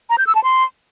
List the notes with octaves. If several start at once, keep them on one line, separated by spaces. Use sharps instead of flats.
A#5
G6
E6
A5
C6